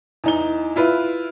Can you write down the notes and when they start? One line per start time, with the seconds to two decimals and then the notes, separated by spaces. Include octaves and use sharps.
0.24 E2 D#4 G7
0.76 E4 F4 B4